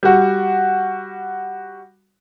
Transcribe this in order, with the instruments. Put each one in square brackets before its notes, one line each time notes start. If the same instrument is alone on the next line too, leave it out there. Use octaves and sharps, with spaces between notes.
[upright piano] G3 F#4